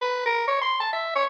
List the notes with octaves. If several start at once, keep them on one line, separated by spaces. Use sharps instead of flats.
B4
A#4
C#5
C6
A5
E5
C#5